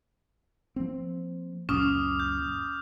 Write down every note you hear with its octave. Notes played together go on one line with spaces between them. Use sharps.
F3 A#3 C4
C#2 F#2 A#2 C#4 D6 D#6 F6
G6